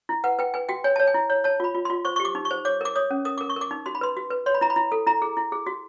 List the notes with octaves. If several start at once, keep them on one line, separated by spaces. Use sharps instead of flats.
E4
B4 F#5
B4 G5
B4 G#5
F#4 G5
C#5 G#5
C#5 A5
G#5
E4
C#5
C#5 A5
F4 B5
F4
C6
F4
C5 C#6
G4 C#6
D6
D#4
C#6
C5
C#5 D6
A#4 D6
C#5 D#6
C#4
A#4 D#6
A#4 D6
C#6
A#4 D6
D#4
F#4 C6
B5
B4 C6
F#4
B4
C#5 C6
B5
E4 A#5
B5
E4
A4
E4 A#5
G#4
E4
G#4
F#4